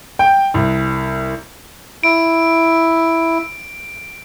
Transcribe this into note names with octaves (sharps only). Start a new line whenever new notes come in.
G5
C2
E4 D7